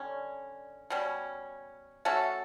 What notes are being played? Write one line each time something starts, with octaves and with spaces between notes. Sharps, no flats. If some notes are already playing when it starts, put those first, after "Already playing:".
Already playing: D3 G3 C#4
B2 G3 C#4
A3 C#4 F#4 A4